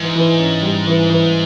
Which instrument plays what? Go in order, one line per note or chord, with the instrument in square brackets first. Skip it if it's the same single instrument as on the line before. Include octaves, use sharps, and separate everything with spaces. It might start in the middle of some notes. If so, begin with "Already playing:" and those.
Already playing: [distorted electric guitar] G#2 [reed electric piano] E3
[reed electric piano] E3
C#4
G3
E3
E3